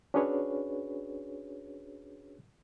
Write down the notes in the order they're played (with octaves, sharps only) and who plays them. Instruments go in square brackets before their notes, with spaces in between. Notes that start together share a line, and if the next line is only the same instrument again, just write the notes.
[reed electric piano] C#4 D4 F#4 G#4 B4 C#5